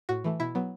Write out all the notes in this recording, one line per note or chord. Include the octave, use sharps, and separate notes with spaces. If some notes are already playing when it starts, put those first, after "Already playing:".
A2 F#4
E3 A3
B2 E4
F#3 B3